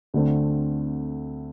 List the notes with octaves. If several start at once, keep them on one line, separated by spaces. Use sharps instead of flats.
D2 D3 A3 C4